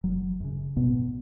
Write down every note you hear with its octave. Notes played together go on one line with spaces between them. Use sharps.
F#1 F#3
F#2 C#3
G#1 B2 B3